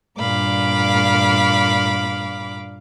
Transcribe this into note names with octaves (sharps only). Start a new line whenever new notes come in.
G2 A#2 F5 B5 D6